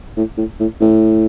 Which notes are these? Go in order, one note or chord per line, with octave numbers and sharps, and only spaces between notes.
A2
A2
A2
A2